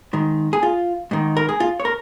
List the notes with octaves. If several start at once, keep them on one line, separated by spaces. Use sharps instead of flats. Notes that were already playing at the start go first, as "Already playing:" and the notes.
G#2 D#3
G#4
F4
G#2 D#3
A#4
G#4
F4
C#5
A#4